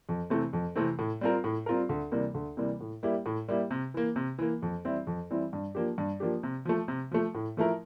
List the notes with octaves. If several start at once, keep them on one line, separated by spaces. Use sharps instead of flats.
F2
C3 E3 A3 C4
F2
C3 E3 A3 C4
A2
G3 C4 F4 A#4
A2
G3 C4 F4 A#4
D2
C3 E3 G3 A#3
D2
C3 E3 G3 A#3
A2
G3 A#3 E4 G4
A2
G3 A#3 E4 G4
C3
E3 A#3
C3
E3 A#3
F2
E3 G3 C4 E4
F2
E3 G3 C4 E4
G2
F3 A#3 D4 G4
G2
F3 A#3 D4 G4
C3
F3 A3
C3
F3 A3
A2
F3 A3 E4 A#4